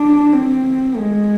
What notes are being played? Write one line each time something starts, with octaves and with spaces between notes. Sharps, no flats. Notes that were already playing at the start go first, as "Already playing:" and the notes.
Already playing: D4
C4
G#3